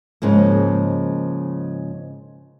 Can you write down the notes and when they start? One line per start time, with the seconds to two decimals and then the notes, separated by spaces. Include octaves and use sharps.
0.22 G#2 C#3 F3 A#3